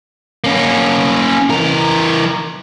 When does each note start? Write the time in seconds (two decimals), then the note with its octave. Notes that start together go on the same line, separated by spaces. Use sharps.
0.44 A#3 C#4
1.50 E3 A#4